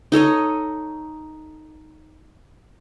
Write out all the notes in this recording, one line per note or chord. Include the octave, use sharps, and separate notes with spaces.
D#4 A4 C#5 D#5